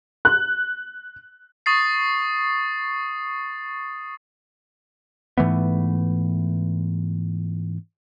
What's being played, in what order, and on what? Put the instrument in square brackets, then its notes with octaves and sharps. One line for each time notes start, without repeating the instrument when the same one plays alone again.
[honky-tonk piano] F#6
[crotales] C#6 D#6 A6 C7
[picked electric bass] G#2 E3 A3 B3